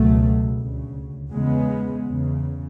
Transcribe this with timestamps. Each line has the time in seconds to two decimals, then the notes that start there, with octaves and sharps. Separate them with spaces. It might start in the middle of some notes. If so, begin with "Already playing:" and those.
Already playing: C#2 B2 F#3 A3
0.58 D2 C#3
1.31 E2 C#3 G#3 B3
2.05 E2 C#3